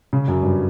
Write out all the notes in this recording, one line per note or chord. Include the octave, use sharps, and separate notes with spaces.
C#3
F#2
G2